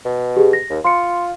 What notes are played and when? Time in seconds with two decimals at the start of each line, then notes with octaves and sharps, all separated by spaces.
0.05 B2
0.37 G4 G#4
0.53 A#6
0.70 D#2
0.84 F4 C6 C#7